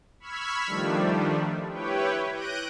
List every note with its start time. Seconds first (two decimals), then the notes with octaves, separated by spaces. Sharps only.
0.20 B5 C#6 E6 F6 G#6 B6
0.67 D#3 F3 G3 A3 D4
1.70 E4 G4 B4 C#5 G5
2.34 F#6 G6 A#6 D7 D#7